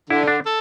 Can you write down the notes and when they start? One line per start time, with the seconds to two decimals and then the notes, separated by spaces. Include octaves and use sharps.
0.10 D3 E4
0.28 D4
0.45 A4